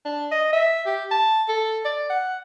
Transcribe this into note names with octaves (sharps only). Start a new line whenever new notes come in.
D4
D#5
E5
G4
A5
A4
D5
F#5